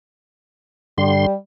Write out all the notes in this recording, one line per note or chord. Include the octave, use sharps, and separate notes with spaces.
G2 D3 G3 C6